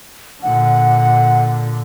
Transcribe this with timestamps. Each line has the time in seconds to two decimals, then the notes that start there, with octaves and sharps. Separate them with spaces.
0.43 A#2 D3 F#5